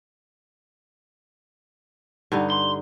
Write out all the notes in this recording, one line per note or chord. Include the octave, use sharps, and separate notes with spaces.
G2 D3 D#4
C6